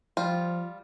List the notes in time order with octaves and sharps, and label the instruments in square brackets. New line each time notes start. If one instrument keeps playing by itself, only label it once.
[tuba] F3 [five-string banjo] G3 F4